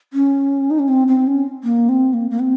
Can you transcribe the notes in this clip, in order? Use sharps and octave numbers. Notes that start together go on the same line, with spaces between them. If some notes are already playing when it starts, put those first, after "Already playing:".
C#4
D#4
C#4
C4
C4
C#4
A#3
C4
A#3
A#3
C4